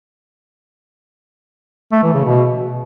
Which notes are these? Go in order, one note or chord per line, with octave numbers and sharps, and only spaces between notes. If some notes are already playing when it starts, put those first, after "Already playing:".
A3
E3
C#3
B2